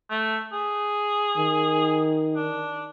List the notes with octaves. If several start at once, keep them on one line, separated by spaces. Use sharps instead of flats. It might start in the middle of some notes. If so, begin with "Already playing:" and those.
A3
G#4
D#3
D4